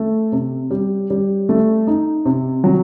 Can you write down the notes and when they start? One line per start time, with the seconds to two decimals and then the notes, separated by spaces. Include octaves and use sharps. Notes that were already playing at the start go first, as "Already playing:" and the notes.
Already playing: A3
0.32 C3
0.71 G3
1.10 G3
1.49 A3
1.87 D#4
2.25 C3
2.64 F#3